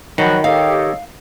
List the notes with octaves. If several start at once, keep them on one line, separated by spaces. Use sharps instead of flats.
D#3 F3 F#3 F#4 B5
G4 A4 C#5 D#5 F5